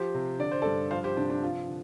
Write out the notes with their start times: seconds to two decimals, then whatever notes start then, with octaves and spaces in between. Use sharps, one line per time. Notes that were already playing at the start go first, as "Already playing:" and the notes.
Already playing: F3 G4 C5
0.14 C3
0.39 D3 D5
0.51 C5
0.62 G2 A4 D5
0.91 F3 C5 F5
1.04 G4 C5
1.16 C3 D4
1.30 D4
1.42 F3 F4
1.68 D3